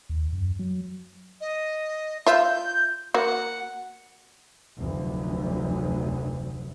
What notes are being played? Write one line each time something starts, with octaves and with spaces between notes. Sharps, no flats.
D#2
F#2
F#3
D#5
F4 E5 G6
A#3 F#4 F#5
F1 D2 F#3